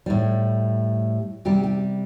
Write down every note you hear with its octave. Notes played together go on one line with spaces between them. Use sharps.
A2 G3
C3 G3 G4
G4